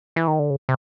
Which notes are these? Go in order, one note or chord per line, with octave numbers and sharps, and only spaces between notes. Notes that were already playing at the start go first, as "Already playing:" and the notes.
E3
D#3
D3
C#3
C3